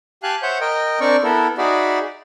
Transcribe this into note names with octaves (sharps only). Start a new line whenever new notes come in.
G4 F5 G#5 A5 F#6
C5 C#5 E5 F#5 G6
A#4 D#5 G5
C4 D4 A#4 D5 C#6
B3 E4 A4 A#4
D#4 F#4 G#4 D5 E5 B5